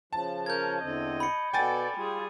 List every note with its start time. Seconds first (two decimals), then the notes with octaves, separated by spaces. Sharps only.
0.13 C#3 F3 A5
0.46 C#4 A#4 G6 G#6
0.82 E2 D3 C4 D#5
1.20 B5 C#7
1.54 B2 B3 A4 D5 G5 G#5 A6
1.97 G3 F4 G#4